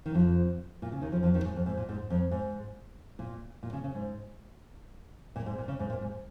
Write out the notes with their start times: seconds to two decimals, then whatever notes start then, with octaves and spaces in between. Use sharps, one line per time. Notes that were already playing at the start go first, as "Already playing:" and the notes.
0.06 D#3
0.14 F2 F3
0.82 A#2
0.92 C#3
1.02 D#2 D#3
1.12 F2 F3
1.23 F2 F3
1.34 D#2 D#3
1.45 G#2
1.56 F2
1.66 G#2
1.77 A#2
1.89 G#2
2.10 F2
2.31 G#2
3.19 A#2
3.63 A#2
3.73 C#3
3.84 C#3
3.95 G#2
5.36 A#2
5.46 G#2
5.58 A#2
5.68 C#3
5.79 G#2
5.90 A#2
6.01 G#2